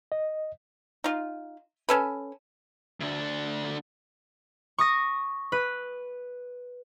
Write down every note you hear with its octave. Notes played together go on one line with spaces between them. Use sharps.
D#5
D#4 F4
C#4 A4 B4
D2 D4
C#6 D#6 A#6
B4